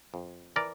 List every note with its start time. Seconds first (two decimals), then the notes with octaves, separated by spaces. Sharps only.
0.14 F2
0.56 E3 A#4 D5